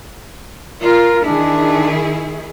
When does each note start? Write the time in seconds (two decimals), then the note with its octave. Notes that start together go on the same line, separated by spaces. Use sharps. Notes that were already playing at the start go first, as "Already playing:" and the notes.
0.82 F4 A#4
1.24 D#3 D4 E4 G#4